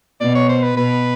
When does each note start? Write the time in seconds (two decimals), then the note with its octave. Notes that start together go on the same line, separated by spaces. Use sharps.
0.20 B2 D5
0.35 C#5
0.49 C5
0.63 B4
0.77 B2 B4